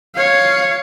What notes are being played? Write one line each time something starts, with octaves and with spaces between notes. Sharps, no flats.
C#5 F5